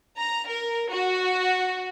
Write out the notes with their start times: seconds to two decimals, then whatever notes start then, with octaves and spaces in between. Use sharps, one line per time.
0.18 A#5
0.49 A#4
0.91 F#4